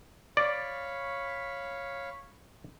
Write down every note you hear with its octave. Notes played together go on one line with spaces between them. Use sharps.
C#5 D5 F5 B5